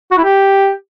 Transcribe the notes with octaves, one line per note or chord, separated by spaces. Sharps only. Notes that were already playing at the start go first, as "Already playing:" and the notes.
F#4
E4
G4